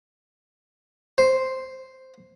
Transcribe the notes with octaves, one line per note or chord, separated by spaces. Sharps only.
C5